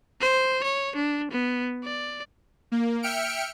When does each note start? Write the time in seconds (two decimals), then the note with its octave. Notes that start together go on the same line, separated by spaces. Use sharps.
0.21 C5
0.63 C#5
0.95 D4
1.31 B3
1.84 D5
2.72 A#3
3.03 E5 G5 F6 C#7 D7